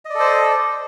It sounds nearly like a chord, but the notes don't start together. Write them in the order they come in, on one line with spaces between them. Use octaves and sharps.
D#5 D5 A4 C5